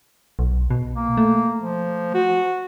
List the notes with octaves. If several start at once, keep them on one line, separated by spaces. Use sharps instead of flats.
B1
B2
A#3
A3
F3
F#4